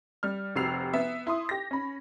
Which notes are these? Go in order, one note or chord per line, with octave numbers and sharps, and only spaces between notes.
G3 F6
F1 C3 F#4 E6 C7 F7
B3 E5
E4 C6 D#6
G4 A#6
C#4 B5